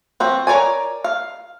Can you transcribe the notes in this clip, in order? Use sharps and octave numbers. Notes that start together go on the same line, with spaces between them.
F3 C4 F#4
A#4 C#5 D5 G#5
F5